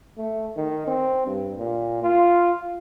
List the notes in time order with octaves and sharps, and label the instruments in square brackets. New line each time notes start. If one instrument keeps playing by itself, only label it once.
[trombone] A3
D#3
C4
G2
A#2
F4